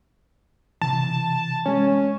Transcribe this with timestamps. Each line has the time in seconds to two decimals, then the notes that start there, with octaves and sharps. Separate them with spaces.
0.82 C3 E3 A5
1.66 G#3 C#4 C#5